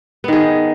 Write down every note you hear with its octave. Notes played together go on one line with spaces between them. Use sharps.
D#3 B3 G#4